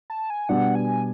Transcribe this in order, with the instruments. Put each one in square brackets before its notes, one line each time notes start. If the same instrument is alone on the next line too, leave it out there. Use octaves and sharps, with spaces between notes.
[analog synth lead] A5
G#5
[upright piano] B2 G3 B3 D4 [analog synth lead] F#5
[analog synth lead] G#5